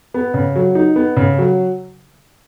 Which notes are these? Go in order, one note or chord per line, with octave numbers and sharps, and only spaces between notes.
B3
C#3
F#3
D#4
B3
C#3
F#3